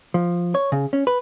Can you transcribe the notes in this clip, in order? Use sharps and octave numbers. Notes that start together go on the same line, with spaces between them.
F3
C#5
C#3
C#4
B4